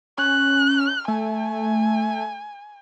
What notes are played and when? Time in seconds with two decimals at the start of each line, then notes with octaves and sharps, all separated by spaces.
0.18 C#4 F#6
1.08 A3 G#5